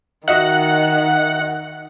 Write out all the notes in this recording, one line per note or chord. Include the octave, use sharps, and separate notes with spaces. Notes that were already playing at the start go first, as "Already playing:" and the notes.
D#3 F#4 D#5 E5 F#5